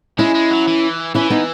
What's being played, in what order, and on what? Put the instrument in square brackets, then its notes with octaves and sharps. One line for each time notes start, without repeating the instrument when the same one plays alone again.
[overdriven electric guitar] G#3 [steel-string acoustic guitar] C#4 E4
[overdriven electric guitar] G#3
F#3
E3
[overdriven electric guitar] E3 [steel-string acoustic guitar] C#4 E4
[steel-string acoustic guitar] B3 D#4